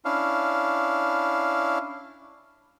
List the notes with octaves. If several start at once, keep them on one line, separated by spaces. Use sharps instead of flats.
C#4 D4 E4 F5